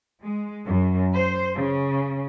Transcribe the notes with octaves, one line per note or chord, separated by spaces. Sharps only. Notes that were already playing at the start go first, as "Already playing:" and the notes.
G#3
F#2
C5
C#3